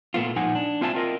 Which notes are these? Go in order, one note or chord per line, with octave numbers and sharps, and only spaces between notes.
A#2 A3 B3 F4
A#2 F3 D#4 F#5 G#5
D4
C4 F4 E5 G#5 A5
C4 F4 A#4 D#5